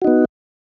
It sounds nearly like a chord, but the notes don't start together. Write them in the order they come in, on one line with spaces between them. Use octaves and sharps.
F#4 D#4 B3